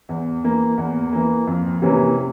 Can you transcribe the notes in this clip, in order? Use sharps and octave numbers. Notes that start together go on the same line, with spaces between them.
E2
E3 A#3
E2
E3 A#3
F2
C3 E3 A#3 C#4